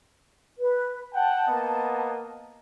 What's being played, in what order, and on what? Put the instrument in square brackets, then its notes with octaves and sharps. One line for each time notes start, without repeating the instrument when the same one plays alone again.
[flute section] B4
[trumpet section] F#5 G5 [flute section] A5
[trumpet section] A#3 B3 D#5